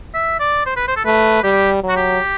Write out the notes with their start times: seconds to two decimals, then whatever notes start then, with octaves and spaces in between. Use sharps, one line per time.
0.14 E5
0.40 D5
0.66 C5
0.76 B4
0.88 C5
0.97 A4
1.05 A3 B4
1.43 G3 G4
1.83 F#3
1.89 F#4
1.97 G4